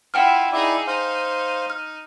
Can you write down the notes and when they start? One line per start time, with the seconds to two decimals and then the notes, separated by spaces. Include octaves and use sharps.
0.14 E4 F4 F#5 G5 F6
0.52 D#4 E4 G#4 D5
0.87 D#4 C5 F5
1.70 F6